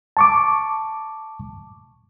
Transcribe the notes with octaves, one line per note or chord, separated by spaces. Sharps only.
A5 C#6 D6